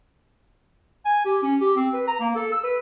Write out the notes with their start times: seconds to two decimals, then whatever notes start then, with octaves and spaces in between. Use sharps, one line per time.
1.05 G#5
1.25 G4
1.43 C#4
1.60 G4
1.76 C4
1.93 B4
2.07 A#5
2.20 A#3
2.35 A4
2.52 E6
2.63 B4